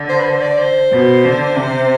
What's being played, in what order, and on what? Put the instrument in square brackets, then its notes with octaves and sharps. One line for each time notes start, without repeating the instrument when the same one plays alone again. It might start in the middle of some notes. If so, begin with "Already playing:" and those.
Already playing: [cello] D3
[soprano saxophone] C5
B4
C5
D5
C5
[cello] B2
D3
C3